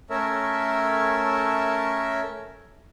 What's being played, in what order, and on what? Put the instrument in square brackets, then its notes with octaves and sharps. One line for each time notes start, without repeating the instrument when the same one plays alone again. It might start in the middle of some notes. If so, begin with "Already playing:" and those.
[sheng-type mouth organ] A3 C#4 A4 A#4 C#5 E5